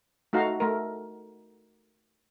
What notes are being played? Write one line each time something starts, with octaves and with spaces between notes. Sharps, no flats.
A3 D#4 F#4 F5 A#5
A3 A#4